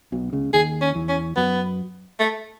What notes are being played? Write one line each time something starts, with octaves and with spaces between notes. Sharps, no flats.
B1 B2
C#2 C#3
D#2 D#3 G#4
C#4
E2 E3
C#4
F#2 F#3 B3
A3